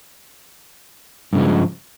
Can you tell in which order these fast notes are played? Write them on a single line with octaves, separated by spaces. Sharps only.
G2 C#3 G#3 F3